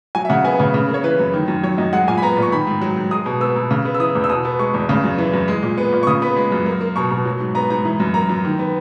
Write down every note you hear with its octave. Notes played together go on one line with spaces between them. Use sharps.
F#3 G#5
E5
C#3 F#5
B3 G#5
C#3
C#3
A#3
C#5
E3 B4
F#2
D#3
F#2
F#3 C#5
F#2 D#5
G#3 F#5
A#2 G#5
B5
B3 A#5
A#2
C#6
D#3 B5
G#2
F#3
G#2
G#3 D#6
B2
B3 E6
B2
C#3
B3
E6
E3 D#6
E2
E6
B2 D#6
B3
G#3 C#6
E2
C#3
F#2
E3
F#2
G#3
A#2
B3
A#2
C#6
C#3 D#6
B3 B5
G#3
F#2
A#3
A#3
B2 C#6
B2
F#3
G#2
B3 A#5
G#2 A#5
E3
F#2
A#3 A#5
F#2
D#3
B3